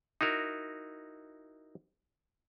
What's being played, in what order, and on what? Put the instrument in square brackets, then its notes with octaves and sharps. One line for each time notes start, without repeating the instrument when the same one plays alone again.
[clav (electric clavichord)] D#4 E4 F#4 A#4